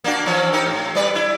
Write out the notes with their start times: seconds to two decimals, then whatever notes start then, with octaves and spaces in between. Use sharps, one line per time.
0.04 A#3 D4 F#4
0.26 E3 F3 C#4
0.53 D#4 G4 A#4
0.66 A2
0.95 G3 B4 D5
1.15 E4